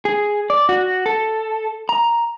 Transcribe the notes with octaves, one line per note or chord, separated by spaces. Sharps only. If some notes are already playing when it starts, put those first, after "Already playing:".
G#4
D5
F#4
A4
A#5